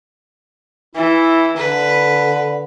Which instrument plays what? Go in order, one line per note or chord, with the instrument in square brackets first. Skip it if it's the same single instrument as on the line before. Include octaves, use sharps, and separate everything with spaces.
[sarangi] E3 [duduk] E4
[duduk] D3 [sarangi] B4